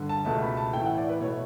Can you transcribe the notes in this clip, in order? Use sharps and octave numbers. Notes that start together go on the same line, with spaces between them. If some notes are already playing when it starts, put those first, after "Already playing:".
Already playing: G2 D3
A5
C#2 B2 A3 A5
B5
A5
A2 E3 A3 G5
F#5
D5
B4
B2 A3 C#5